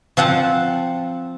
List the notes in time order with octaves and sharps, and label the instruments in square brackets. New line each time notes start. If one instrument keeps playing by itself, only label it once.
[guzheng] F3 C4 F#5 A5